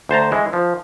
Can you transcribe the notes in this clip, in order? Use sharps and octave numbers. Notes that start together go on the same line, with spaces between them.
D2 C5 A5 A#5
E3 G#3
F3